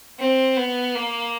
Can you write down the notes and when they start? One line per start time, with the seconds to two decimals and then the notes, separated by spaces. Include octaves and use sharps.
0.19 C4
0.57 B3
0.95 A#3